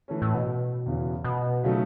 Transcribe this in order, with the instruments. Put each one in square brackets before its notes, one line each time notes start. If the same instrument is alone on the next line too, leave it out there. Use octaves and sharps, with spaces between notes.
[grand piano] E3 A3 C#4
[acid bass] A2
B2
[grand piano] E2 C#3 E3
[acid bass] B2
[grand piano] C#3 F#3 A3 D#4